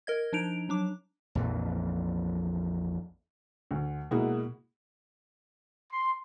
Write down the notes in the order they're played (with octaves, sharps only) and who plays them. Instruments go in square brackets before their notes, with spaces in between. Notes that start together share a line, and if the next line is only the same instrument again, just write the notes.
[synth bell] A#4 D#5 G#6
F3 D4 D#4 D7 F7
F#3 D4 D6
[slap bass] A#1 F2 E3
[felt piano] D2
B2 G#3 A#3 E4 F#4 G#4
[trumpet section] C6